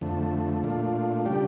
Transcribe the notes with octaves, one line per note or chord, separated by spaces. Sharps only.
F2 D3 A3
A#2 A3 D4 F4
C#3 G3 D4 G4